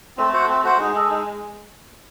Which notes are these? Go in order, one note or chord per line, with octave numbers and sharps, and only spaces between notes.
A3 C4
F#4 C5 F#5
C4
F#4 C5 F#5
G#3 D#4
A4 D#5
D#4